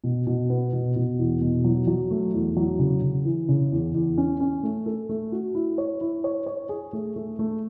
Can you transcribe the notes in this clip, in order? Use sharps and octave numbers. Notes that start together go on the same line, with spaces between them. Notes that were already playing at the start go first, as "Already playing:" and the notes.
B2
B2
B3
B2
B2
E2
B2
F#3
F#3
A3
E2
F#3
C#3
C#3
E3
C#3
E2
E2
C#4
C#4
A3
A4
A3
F#4
E4
C#5
E4
C#5
C#5
G#4
A3
A3
A3